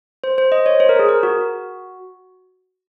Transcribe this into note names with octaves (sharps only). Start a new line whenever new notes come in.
C5
C5
D#5
C#5
C5
A#4
G#4
A#4
F#4